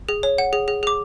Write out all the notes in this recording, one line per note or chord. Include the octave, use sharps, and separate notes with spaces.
G#4
C#5
F#5
G#4
G#4
G#4 D6